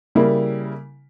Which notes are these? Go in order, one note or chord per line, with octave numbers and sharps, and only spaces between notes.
C#3 G3 A#3 E4